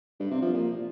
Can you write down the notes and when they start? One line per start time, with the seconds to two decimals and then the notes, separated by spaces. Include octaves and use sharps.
0.20 G2
0.31 C3
0.42 F3
0.53 A#2